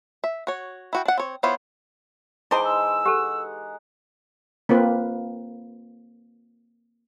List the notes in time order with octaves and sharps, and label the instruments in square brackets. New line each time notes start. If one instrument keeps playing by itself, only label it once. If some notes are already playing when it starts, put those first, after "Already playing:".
[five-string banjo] E5
F#4 C#5
E4 F#4 G5
D4 F#5
C4 C#5
B3 E4 F4 C5 C#5
[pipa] E3 C5 [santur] G#3 D#4 D6 [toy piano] E4 A5 [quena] G5
[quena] E6
[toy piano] G4 A4 [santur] F#5
[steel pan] A#3 C4 F4 B4